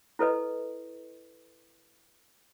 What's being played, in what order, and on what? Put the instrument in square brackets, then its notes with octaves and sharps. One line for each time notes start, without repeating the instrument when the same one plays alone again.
[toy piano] E4 A4 B4 D#5